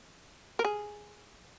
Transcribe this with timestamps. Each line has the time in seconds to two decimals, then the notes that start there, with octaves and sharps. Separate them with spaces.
0.59 A#4
0.65 G#4